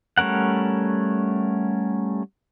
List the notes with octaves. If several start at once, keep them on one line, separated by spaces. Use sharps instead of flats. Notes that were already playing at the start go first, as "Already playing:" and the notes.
G3 A3 C#4 A#4 F#5